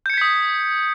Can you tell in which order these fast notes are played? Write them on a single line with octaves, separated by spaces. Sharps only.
G6 C#7 G#6 B6 D#6